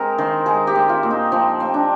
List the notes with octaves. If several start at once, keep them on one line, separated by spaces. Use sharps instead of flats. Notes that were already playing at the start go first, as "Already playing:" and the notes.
Already playing: G#3 C4 A#4
D#3 C5
G#3 G#4
G4
C4
F4
A#2
D#4
F3 C4
C4
D4